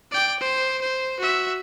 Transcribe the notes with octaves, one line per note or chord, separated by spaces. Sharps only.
D5 G5
C5
C5
F#4 E5